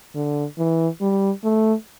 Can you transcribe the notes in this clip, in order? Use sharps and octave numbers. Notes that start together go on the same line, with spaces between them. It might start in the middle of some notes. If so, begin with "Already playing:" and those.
D3
E3
G3
A3